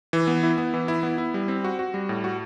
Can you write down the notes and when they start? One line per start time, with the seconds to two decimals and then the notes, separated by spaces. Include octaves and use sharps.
0.13 E3
0.27 B3
0.43 E4
0.58 B3
0.74 E3
0.88 E4
1.03 B3
1.18 E4
1.34 G3
1.48 C4
1.64 F#4
1.79 F#4
1.94 G3
2.09 A2
2.24 F#4